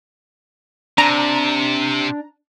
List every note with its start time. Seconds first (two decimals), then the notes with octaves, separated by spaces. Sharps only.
0.98 C3 D4 A#5